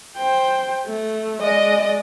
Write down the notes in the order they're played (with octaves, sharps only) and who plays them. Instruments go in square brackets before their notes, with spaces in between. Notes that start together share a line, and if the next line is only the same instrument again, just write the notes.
[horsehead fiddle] C5 G5
A3
[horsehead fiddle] G#3 D5 [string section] D#5